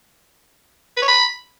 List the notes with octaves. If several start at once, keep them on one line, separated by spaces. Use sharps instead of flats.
B4
C#5
B5